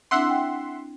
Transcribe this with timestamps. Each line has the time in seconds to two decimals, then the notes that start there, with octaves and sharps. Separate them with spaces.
0.11 C4 D4 E4 E5 F#5 C6
0.30 G5